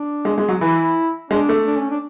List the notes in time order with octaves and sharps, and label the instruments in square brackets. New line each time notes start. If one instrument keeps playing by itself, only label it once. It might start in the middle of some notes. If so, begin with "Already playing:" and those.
Already playing: [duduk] D4
[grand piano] G#3
G#3
F#3
[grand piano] E3 [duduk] E4
[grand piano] G#3 [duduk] D4
[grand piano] A3
[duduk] D4
C#4
D4